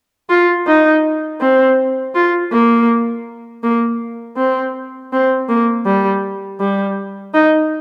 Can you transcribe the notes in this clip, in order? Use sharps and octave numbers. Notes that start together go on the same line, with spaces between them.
F4
D#4
C4
F4
A#3
A#3
C4
C4
A#3
G3
G3
D#4